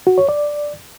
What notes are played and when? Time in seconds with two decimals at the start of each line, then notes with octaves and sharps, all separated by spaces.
0.07 F#4
0.18 C#5
0.29 D5